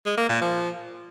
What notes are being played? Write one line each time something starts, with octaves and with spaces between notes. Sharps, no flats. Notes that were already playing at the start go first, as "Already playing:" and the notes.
G#3
A#3
A#2
F3